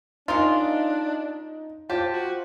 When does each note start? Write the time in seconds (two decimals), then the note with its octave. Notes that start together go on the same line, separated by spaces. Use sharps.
0.28 C#3 A#3 D4 D#4 F4
1.90 F4 G4 C5 A5
2.13 F#4